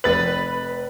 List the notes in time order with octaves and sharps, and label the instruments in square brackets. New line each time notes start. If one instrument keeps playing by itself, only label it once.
[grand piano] F1 A6 F#7 [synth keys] B4